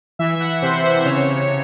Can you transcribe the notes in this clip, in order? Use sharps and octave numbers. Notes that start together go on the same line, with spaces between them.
E3 E5
F#5
C3 C5
C5
C#3 C#5